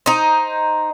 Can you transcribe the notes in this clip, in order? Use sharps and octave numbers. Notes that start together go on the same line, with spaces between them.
D#4 C5